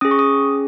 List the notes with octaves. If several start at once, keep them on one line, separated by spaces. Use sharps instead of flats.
C#4 G#4 D#6
C#6
D#6